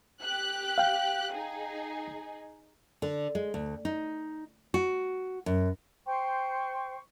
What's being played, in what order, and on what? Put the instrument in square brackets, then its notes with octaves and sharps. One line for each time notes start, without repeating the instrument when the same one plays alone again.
[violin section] G4 F#6
[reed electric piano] F5 G5
[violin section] D#4 G#4
[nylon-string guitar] D3
G#3
D2
D#4
F#4
F#2
[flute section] C5 G5 C6 C#6